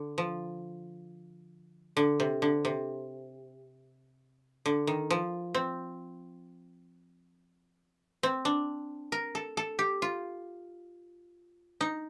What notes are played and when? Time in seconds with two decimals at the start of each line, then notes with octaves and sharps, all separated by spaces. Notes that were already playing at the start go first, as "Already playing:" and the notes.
Already playing: D3
0.18 F3
1.97 D3
2.20 C3
2.42 D3
2.65 C3
4.66 D3
4.87 D#3
5.10 F3
5.55 C4
8.23 C4
8.45 D4
9.12 A#4
9.35 A4
9.57 A4
9.79 G4
10.02 F4
11.81 D#4